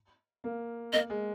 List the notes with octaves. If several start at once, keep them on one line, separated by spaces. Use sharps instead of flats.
A#3
A#3 D#5
G#3